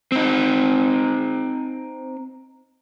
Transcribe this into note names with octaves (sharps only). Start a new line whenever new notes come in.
C4 D#4